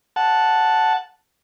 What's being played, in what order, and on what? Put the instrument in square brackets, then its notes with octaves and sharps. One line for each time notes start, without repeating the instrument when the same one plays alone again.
[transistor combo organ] F#5 A5